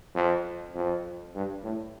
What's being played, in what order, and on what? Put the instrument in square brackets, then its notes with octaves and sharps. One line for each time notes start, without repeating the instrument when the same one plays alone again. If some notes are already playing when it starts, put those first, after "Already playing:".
[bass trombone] F2
F2
G2
A2